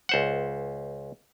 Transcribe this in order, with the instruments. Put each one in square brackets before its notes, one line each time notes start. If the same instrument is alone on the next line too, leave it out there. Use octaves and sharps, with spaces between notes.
[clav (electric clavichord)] C#2 C5 F#5